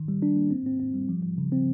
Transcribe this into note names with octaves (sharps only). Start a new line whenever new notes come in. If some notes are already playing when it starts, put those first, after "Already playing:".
Already playing: D#3
G3
D4
A#3
C4
C4
C4
G3
F3
F3
C#3
C4